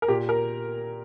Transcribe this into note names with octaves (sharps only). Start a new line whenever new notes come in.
A#4
A#2 G4
A#4